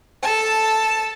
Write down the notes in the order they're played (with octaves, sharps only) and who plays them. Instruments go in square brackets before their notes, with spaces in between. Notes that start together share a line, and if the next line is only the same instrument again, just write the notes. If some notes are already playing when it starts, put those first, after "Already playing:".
[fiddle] A4 A5